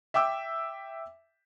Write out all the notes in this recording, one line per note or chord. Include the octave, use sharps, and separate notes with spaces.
E5 G5 D6 E6